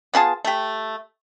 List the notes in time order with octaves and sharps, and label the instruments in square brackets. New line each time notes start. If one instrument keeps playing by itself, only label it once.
[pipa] B3 F4 G#4 A5
A3 G4